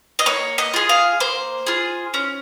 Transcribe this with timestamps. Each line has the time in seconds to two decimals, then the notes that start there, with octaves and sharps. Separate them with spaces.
0.19 D#5
0.26 A#3 C#5
0.58 D#5
0.74 F4 G#4
0.89 F5
1.20 A#3 C5
1.67 F4 G#4
2.14 C#4